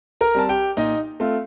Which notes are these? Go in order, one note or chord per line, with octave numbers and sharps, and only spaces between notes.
A#4 A#5
G3 C4 A5
G4 G5
A#2 D#4 D#5
A3 C4 F4